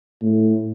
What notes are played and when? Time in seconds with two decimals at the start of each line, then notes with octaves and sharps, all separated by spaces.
0.22 A2